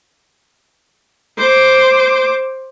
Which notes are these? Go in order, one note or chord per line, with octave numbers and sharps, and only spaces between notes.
C5 D6